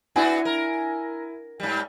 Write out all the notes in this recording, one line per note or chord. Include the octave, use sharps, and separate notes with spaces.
B3 D4 E4 F#4 G#5
A#4
G#2 G3